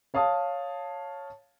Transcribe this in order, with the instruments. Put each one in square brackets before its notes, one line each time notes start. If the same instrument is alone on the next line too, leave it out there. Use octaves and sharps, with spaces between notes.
[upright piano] C#5 F5 A5 D#6